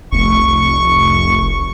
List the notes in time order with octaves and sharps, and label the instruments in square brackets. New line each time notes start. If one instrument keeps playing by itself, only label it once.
[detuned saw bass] F1 [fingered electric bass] C2 A3 C4 [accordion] C#6